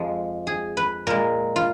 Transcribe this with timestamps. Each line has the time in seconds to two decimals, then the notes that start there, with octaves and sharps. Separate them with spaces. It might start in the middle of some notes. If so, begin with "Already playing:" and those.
Already playing: F2 F3 G#3
0.47 G#4
0.77 B4
1.07 A#2 G#3 A#4
1.56 F4